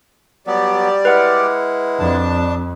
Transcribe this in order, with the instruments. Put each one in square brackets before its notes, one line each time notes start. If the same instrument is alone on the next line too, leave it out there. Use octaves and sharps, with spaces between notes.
[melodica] F#3 B3 [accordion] G3 G4 D5
[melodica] G#3 E4 [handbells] B4 F#5 F6
[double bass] F2 [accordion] D4 A5